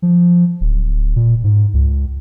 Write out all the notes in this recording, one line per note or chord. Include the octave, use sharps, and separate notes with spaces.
F3
D1
A#2
G#2
C#2